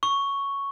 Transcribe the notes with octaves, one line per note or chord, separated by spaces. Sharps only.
C#6